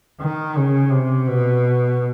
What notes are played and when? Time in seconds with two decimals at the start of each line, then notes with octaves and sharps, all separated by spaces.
0.21 D#3
0.56 C#3
0.91 C3
1.27 B2